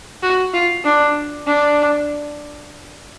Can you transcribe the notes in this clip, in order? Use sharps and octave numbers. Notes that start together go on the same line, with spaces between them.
F#4
F4
D4
D4